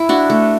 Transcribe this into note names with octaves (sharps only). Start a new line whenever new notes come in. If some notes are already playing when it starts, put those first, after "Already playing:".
Already playing: E4
D4 F#4
A3